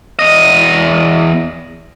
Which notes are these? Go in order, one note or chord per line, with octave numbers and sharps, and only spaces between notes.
E2 D#5